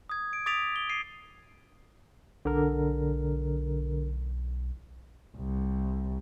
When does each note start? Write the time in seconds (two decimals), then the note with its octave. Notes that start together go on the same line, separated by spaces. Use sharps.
0.10 D#6 G#6
0.33 D7
0.46 D6 D#6 A6 B6 D7 F7
0.76 G7
0.90 C7 D#7
2.45 B1 D3 A#4
5.37 C2